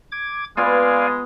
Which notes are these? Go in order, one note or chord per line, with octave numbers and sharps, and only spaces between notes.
D6 G#6
G#3 B3 F4 D5 F5 G#5